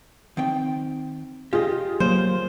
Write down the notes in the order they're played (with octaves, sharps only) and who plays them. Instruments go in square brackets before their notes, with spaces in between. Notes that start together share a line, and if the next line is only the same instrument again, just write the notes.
[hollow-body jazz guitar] D#3 C4 G5
[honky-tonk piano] F4 G#4 [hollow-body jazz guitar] G4 D#5
[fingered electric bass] F#3 A#3 [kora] C5